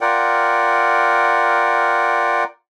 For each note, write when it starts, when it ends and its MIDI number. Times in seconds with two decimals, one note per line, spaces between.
0.01 2.44 65
0.01 2.44 70
0.01 2.44 74
0.01 2.44 78
0.01 2.44 79